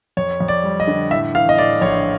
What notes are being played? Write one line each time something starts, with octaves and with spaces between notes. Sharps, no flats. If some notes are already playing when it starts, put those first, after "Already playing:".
F2 C#5
F2
D5
G3
D#5
D3
A2 E5
E3 F5
D#5
A2 D5
A#1 C#5